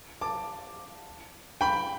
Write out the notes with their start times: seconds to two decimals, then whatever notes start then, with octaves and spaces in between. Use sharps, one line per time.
0.21 A5 D6
1.61 G5 B5